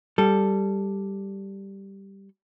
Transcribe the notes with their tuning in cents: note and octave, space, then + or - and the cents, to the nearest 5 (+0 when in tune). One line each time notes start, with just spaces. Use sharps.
G3 +0 A4 +0